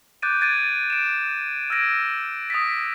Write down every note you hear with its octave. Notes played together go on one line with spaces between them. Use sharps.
D6 F#6 G6 A6 D7 D#7
D6 G#6 A6 D7 D#7
D7 E7
E6 F6 G#6 A#6 D7
D#6 A6 B6